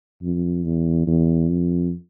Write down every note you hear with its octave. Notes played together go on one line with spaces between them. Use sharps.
F2
E2
E2
F2